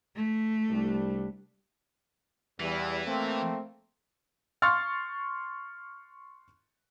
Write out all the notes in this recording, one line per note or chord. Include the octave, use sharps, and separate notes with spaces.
A3
C2 G3 D4
E2 E3 G3
A3 A#3 C4
C6 C#6 F6 A6